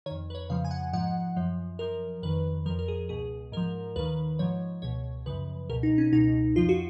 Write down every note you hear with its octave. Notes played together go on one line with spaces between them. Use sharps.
D#3 C#5
F2
B4
C#5
F2 C#3 F3 F5
G#5
F#5
G#2 F3 F#5
F#2 F3
F#2 F3 A#4
F2 D#3 B4
F2 F3 A#4
A#4
G#4
C#2 B2 G#4
G#2 F3 A#4
D#2 D#3 B4
G#2 F3 C#5
C#2 B2 C#5
F#2 C#3 F3 B4
C#2 B2 A#4
D#4
C#4
C#2 B2 D#4
F2 F3 F4
F#4